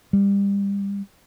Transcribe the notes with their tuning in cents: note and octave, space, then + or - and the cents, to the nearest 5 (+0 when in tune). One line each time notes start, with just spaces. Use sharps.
G3 +30